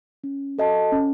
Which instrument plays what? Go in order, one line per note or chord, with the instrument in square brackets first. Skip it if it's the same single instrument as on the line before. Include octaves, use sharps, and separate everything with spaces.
[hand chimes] C#4
F#4 A4 D#5 A5
C#4